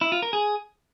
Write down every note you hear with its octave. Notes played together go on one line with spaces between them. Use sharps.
E4
F4
A#4
G#4